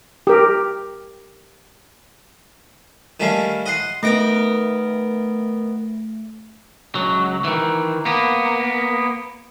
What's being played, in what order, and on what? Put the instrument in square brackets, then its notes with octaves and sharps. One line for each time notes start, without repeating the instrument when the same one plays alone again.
[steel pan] G4 A#4
[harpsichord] D#3 G3 A3 C#4 F5
D#5 F#5 C6
[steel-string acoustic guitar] D#3 B3 A#4 [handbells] A3 A#6 D7
[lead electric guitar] C#2 F#3
D#3 E3
A#3 B3